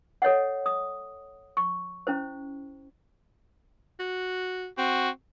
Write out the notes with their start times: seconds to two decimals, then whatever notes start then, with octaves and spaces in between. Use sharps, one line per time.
0.22 A4 C#5 D#5 F#5
0.66 D#6
1.57 C#6
2.07 C#4 E4 C5
4.00 F#4
4.78 C4 F#4